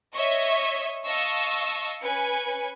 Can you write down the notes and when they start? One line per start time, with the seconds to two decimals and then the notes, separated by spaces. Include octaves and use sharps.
0.15 C#5 D#5 E5 C#6
1.06 D#5 F5 A5 C#6 E6
2.00 C#4 B4 G#5 C#7